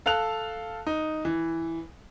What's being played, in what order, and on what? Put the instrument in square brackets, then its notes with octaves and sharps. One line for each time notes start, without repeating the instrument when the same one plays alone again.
[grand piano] A4 F5 A5 F#6 F7
D#4
E3